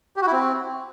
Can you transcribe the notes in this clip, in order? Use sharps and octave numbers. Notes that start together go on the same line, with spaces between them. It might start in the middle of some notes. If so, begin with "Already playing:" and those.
G4
F#4
E4
C4